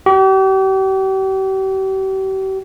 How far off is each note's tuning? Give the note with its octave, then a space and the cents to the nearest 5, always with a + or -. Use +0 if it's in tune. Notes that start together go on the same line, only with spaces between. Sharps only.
G4 -40